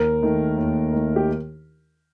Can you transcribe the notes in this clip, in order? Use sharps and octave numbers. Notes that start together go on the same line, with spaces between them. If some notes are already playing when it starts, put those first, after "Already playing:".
Already playing: D#2 A#4
D#3 A3
D#2
D#3 A3
G4